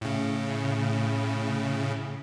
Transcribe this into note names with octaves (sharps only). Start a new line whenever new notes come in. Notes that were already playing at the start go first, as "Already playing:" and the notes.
A2 C#3